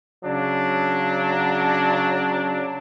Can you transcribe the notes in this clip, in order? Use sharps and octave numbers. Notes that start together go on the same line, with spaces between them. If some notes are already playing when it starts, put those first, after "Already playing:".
C#3 F#3 D4